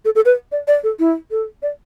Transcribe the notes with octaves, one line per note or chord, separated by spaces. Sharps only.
A4
A4
B4
D5
D5
A4
E4
A4
D5